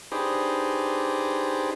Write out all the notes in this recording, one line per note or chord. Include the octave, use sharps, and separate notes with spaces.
D4 D#4 G4 G#4 B4 C5